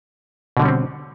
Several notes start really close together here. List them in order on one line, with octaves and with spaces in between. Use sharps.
B2 D3 G3 C#4 C4